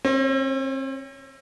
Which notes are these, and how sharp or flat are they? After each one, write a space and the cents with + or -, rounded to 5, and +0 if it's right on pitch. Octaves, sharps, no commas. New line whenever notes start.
C4 +40 C#5 +0